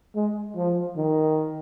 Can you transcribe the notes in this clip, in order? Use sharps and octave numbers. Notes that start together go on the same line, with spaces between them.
G#3
F3
D#3